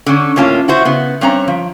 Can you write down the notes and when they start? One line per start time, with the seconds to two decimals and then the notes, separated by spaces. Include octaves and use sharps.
0.06 D3 C#4
0.36 A2 A#3 C#4 F4 A5
0.68 E4 F#4 C5
0.85 C#3 B3
1.21 G2 C4 C#4 A#5
1.48 F3